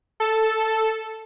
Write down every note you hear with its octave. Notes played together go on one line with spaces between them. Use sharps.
A4